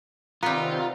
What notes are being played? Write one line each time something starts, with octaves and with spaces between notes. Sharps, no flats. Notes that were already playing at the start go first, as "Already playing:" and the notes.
C3 D#3 G3 B3 C4 F4 A#5